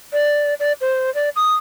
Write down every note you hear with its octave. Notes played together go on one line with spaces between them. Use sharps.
D5
D5
C5
D5
D#6